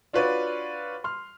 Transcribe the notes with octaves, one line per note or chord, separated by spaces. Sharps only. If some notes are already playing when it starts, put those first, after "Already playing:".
D4 F4 F#4 B4 C#5 D5
C6 F6